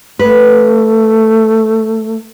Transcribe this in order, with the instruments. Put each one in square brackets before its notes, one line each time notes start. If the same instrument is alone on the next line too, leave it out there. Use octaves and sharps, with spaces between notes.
[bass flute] A3 [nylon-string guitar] B4